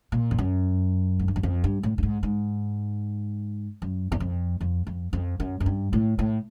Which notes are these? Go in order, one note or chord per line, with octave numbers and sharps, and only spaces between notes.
A#2
F2
F#2
G#2
G2
F#2
F2
G2
A2
G2
G#2
G#2
F#2
E2
F2
F2
F2
F2
F#2
F#2
G2
A2
A2